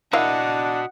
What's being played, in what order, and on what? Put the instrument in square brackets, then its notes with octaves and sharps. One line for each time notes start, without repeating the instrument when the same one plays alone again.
[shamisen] A#3 E4 F5 [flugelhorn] D4 [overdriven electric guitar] F#4 D#5 [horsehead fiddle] F#5